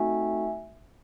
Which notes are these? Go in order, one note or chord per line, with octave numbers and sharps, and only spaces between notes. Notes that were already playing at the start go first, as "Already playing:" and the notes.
Already playing: A3 C4 D#4 F#4 A4 E5 G#5